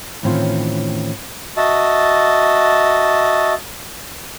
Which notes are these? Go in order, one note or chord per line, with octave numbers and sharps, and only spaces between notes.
A2 D#3 E3 C4 C#4 F4
F#4 D#5 E5 A5